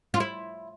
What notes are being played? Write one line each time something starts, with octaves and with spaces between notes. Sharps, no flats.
F4
E4